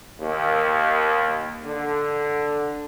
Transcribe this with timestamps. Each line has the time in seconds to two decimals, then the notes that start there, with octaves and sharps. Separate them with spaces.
0.21 D#2
1.66 D3